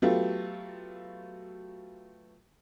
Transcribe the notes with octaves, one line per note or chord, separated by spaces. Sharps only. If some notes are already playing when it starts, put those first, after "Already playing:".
F#3 A3 B3 F4 G4